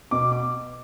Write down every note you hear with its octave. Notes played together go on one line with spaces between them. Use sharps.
B2 D6
D6